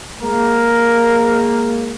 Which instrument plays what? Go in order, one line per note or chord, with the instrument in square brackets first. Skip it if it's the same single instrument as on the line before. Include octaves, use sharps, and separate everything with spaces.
[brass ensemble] G#3 A#3 [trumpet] A#4